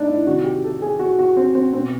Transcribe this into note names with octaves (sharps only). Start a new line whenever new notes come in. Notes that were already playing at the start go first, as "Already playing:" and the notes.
Already playing: A2 D4 D#4
E4
C3 D#3 F#4
G4
A4
G#4
F#4
F#4
C4
C4
B2 C4